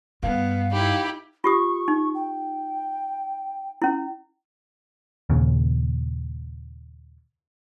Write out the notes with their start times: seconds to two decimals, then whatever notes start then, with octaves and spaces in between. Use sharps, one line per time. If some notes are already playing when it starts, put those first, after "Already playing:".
0.23 G2 B3 F5
0.72 D#4 E4 G4 B5
1.44 F4 G4 C#6 D#6
1.88 D#4
2.15 G5
3.82 C#4 E4
5.30 D#2 A#2 C#3